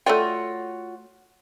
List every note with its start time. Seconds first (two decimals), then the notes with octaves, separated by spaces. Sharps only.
0.06 A3 F4 F#4 C#5 D5 G5